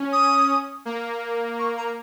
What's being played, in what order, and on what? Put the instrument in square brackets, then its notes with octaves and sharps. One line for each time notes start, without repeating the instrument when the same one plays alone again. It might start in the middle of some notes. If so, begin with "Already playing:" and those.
Already playing: [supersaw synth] C#4
[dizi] D#6
[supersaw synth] A#3
[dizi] C#6
A#5